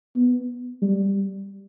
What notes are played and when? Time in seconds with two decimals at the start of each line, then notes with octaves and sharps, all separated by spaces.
0.16 B3
0.82 G3